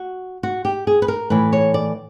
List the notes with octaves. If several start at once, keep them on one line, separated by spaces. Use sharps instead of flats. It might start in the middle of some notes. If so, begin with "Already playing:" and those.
Already playing: F#4
F#4
G4
G#4
B4
A#4
A2 E3 B4
C#5
D5